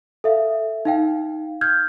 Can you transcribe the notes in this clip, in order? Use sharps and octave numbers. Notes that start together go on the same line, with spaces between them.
A4 E5 F5
D#4 F5 G5
F6 G6 G#6